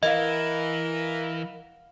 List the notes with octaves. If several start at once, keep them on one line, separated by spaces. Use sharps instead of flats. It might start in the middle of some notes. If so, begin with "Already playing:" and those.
E3 A#4 D#5 F5 F#5